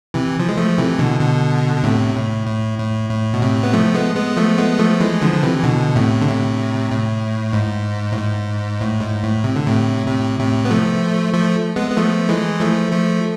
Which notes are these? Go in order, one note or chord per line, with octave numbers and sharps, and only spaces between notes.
C3 E3
F3
G#3
F3 A3
C3 E3
B2 D3
B2 D3
B2
A2 C3
A2
A2
A2
A2
B2
A2 C3
B3
F3 A3
G#3 B3
G#3 B3
F3 A3
G#3 B3
F3 A3
E3 G#3
D3 F3
D3
C3 E3
E3
B2 D3
A2 C3
D3
A2 C3
A2
G#2
A2
G#2
A2
G#2
A2
C3
D3
A2 C3
A2 C3
A2 C3
B3
F3 A3
F3 A3
G#3 B3
B3
F3 A3
E3 G#3
F3 A3
F3 A3